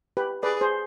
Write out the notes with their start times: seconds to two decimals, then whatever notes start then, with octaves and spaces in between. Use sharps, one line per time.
0.17 G4 B4
0.43 G#4 B4 D5
0.61 G#4 C5